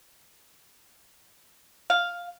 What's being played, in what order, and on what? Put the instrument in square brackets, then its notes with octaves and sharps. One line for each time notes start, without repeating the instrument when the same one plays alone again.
[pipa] F5